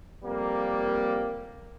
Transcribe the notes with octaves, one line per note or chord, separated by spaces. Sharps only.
F2 G3 A#3